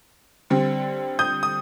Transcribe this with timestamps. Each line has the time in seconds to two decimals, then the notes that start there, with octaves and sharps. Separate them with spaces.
0.50 D3 G3 C4
1.19 D#6 G6
1.43 D#6